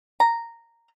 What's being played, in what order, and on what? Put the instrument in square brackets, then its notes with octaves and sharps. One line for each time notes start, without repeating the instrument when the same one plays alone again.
[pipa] A#5